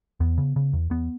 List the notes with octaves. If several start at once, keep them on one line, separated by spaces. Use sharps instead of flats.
E2 B3
C#3
C#3
E2
E2 B3